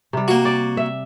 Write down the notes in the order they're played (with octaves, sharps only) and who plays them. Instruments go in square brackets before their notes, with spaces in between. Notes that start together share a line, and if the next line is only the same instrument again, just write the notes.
[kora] C3 G3
[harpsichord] A#3 F#4
[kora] D5
E5